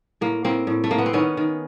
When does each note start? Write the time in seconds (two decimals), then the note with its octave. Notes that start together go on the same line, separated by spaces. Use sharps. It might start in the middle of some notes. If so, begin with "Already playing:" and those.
0.21 A2 A#3
0.45 A2 A#3 C4
0.67 A2
0.84 A3
0.91 A2 A#3
0.98 B3
1.06 C4
1.13 D#3 B3 C#4
1.37 D#3